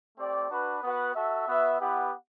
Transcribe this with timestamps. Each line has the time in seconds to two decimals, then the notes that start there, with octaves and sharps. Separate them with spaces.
0.18 A3 C4 G4 D5
0.50 D4 F#4 B4
0.83 B3 F#4 B4 F#5
1.16 F#4 A4 E5
1.48 B3 F#4 B4 E5
1.81 B3 E4 G4 B4 F#5